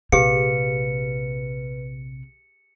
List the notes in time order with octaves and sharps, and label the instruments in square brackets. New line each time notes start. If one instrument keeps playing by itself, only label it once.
[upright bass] A#1 C3 [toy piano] G4 G#4 F5 [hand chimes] B4 [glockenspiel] C#7